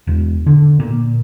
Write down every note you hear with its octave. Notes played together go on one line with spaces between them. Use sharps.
E1
D3
A#2